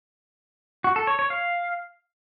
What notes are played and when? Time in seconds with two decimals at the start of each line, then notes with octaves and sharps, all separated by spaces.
0.84 F#4
0.96 A4
1.07 C#5
1.19 C#5
1.30 F5